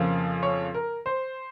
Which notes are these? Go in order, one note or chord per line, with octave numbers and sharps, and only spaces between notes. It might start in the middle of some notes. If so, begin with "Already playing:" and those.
Already playing: F2 C#3 F3 A#3
C#5
A#4
C5